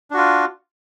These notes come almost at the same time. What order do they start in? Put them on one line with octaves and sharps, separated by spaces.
D4 F#4 F4